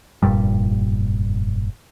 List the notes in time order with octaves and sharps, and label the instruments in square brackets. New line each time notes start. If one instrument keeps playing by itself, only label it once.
[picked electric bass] F1 G2 A#2 G3